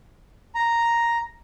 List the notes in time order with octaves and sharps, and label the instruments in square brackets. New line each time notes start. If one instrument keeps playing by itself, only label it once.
[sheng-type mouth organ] A#5